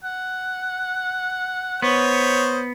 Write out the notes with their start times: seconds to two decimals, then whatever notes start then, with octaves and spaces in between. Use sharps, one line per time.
0.04 F#5
1.82 B3 C5 C#5 D#5